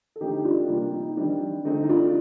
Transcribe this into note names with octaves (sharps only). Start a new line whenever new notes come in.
A4
D3 A3 C4 D#4 G4
D4 F4
C3 G3 A#3
D#4
D#3 G3 C4 D4
D3 A3 C4 D#4
D#4
D4 F4